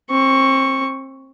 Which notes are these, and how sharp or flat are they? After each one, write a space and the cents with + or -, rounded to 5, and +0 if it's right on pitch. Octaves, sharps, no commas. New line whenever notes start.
C4 +30 C#6 +0